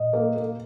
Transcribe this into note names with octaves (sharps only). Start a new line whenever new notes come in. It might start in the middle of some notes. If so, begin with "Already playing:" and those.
Already playing: A#2 D#5
A#3
A#3